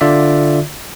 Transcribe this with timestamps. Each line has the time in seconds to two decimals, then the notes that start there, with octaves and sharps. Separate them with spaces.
0.01 D3 F4 D5 E5